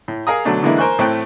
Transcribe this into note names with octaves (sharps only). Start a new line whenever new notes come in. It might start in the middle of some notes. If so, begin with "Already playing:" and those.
A2
G#4 A#4 F5 G#5 A#5 D#6
B2 D3 F#3 A3 D4
D3 E3 G#3 A#3 D4 E4
A#4 C5 G#5 C#6 F#6
A2 A3 C4 G5 F#6